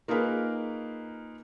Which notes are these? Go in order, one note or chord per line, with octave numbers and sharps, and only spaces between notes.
A#3 D#4 F4 G#4 A#4 B4